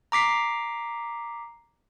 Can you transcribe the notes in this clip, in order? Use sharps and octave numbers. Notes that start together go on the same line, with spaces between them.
A#5 D6 B6 C7